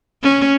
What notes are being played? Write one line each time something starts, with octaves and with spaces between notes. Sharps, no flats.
C#4